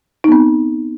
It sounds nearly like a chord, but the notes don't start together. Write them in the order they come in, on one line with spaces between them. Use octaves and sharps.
D#4 B3 C4